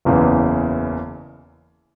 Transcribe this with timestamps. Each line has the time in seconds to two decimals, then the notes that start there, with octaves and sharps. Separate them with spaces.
0.05 F#1 E2 C#3 E3